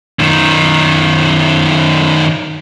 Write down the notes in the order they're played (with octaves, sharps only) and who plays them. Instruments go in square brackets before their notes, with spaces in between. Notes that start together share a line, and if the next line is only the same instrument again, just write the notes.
[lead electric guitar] F#2 D#3